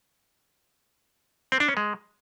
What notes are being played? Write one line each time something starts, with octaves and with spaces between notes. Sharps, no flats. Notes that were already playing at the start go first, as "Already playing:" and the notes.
C4
D4
C#4
G#3